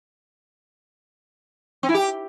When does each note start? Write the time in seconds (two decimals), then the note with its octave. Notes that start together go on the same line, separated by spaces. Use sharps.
1.83 C4
1.89 E4
1.94 G4